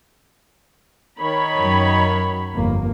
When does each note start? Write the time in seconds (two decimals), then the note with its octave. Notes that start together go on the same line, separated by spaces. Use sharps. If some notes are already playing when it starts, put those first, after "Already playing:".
1.20 D#3 C#5 B5
1.57 F#2 F#3
2.54 G1 F2 A#3